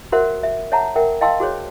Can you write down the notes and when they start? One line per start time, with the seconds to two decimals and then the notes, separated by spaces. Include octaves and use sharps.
0.12 F#4 A#4 C5 E5 F#5
0.43 E5
0.72 C#5 E5 F#5 A5 A#5
0.96 A#4 E5 F#5 G5
1.21 D#5 F5 G5 A5 C6 E6
1.40 F#4 G#4 C5 C#5